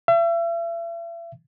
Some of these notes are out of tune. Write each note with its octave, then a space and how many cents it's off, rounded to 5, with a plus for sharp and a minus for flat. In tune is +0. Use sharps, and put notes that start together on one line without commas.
E5 +40